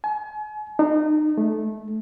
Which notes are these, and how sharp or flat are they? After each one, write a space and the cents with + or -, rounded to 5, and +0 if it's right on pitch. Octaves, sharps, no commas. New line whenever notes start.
G#5 +40
D#4 -30
A3 -15